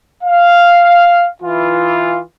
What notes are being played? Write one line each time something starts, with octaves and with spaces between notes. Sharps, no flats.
F5
E3 F4